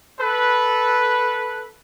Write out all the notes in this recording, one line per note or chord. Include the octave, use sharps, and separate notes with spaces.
A4 B4